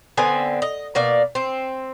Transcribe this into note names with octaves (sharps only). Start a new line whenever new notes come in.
D3 B3 C4 G#5
D#5
B2 A#3 D5
C4